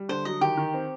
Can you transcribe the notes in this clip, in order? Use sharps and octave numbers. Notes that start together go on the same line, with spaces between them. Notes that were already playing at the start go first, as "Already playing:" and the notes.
Already playing: G3
D3 C5
F#3 D#5
D#3 G4
D#3
C4